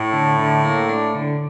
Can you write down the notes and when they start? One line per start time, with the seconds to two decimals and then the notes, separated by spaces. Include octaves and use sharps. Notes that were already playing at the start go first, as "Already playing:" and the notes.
Already playing: A2
0.13 D3
0.39 D3
0.65 A#3
0.89 D4
1.15 D3